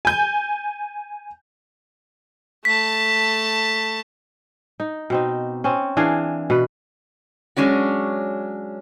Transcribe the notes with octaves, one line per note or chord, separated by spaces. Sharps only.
G#5 G6
A3 A5 B6
D#4
B2 C4 D#4
C4 C#4
E3 D4 G#4 F5
B2 B4
F#3 G#3 C#4 D4 F#4